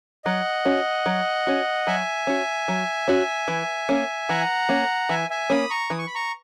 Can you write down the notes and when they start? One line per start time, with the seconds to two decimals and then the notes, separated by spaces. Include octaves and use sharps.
0.25 F#3 D#5 F#5
0.65 C#4 F#4
1.06 F#3
1.47 C#4 F#4
1.87 F#3 E5 G#5
2.27 C#4 F#4
2.68 F#3
3.08 C#4 F#4
3.48 E3
3.89 A#3 C#4
4.29 E3 F#5 A#5
4.69 A#3 C#4
5.09 E3 E5 G#5
5.30 E5 G#5
5.50 A#3 C#4 B5 D#6
5.70 A#5 C#6
5.90 E3 D#6
5.99 C#6
6.07 B5
6.15 A#5 C#6